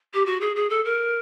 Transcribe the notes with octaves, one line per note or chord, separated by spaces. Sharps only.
G4
F#4
G#4
G#4
A4
A#4